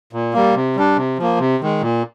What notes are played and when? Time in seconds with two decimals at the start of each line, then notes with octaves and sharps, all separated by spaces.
0.13 A#2
0.33 G3 A#3
0.55 C3
0.76 G3 D4
0.97 C3
1.18 F3 A#3
1.39 C3
1.61 D#3 G#3
1.81 A#2